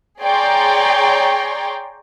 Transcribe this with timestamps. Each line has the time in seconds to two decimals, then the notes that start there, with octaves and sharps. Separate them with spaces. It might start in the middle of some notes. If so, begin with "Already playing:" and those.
0.22 G#4 C#5 D5 G5 A#5 C6